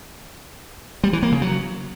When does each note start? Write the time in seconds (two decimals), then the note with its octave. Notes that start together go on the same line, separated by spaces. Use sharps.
1.04 G3
1.13 E3
1.23 A#3
1.32 C#3
1.42 F#3